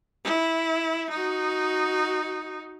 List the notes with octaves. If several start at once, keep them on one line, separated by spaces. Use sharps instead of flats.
E4
D#4 F#4